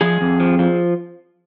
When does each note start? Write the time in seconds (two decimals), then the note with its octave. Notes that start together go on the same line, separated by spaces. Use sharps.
0.01 F3 G#4
0.21 F2
0.40 F3
0.59 F3